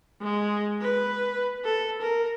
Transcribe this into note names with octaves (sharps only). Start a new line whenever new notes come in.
G#3
B4
A4
A#4